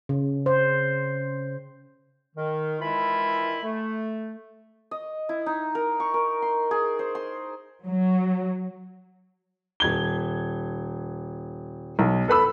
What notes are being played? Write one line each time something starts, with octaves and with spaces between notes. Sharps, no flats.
C#3
C5
D#3
D#3 E3 G#3 E4 F4 B5
A3
D#5
E4
D#4
A#4
C#6
A#4
C6
G#4
C5
C6
F#3
D#1 G#6 G7
B1
A4 B4 B5 E6